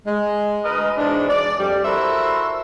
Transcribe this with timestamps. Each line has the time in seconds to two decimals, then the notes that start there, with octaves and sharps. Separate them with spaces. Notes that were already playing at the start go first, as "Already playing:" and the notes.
0.06 G#3
0.64 D2 A#4 B4 D#5
0.97 G#2 B2 E3 G#3 D4
1.29 D5
1.59 F2 G3 G4
1.85 E4 F#4 A4 A#4 C5 E5